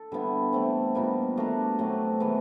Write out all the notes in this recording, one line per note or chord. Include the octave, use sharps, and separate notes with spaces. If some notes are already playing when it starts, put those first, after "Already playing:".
Already playing: A4
D3 G3 B3 E4
E3 A3 C4
A#2 G3 B3 D#4
A3 D4 F#4 A#4
B2 F#3 A3 C4
E3 G#3 B3